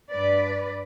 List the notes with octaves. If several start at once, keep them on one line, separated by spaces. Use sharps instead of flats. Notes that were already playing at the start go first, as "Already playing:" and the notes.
G2 B4 D5